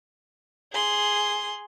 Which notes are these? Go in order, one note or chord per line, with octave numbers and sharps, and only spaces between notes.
G#4 C6